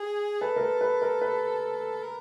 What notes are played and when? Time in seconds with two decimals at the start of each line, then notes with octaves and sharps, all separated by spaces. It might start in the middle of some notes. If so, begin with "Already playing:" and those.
Already playing: G#4
0.41 A4 B4
0.56 A#4
0.61 B4
0.81 B4
1.02 A#4
1.22 B4
2.03 A#4